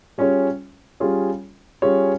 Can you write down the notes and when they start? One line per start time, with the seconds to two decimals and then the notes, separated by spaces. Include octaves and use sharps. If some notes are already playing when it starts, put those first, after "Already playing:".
0.18 G3 C#4 F4 G#4 C#5
1.00 G3 C#4 F4 G#4 C#5
1.82 G3 C#4 F4 G#4 C#5